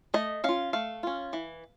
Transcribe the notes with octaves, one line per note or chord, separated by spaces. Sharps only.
A3 D#5
C#4 F4 F5
A3 F5
C#4 F4
E3